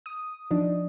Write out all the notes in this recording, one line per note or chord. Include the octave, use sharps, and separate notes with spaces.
D#6
F3 D4 D#4